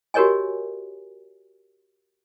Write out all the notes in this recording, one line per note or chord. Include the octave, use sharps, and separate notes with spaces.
F#4 G4 A#4 C#5 D#5 G#5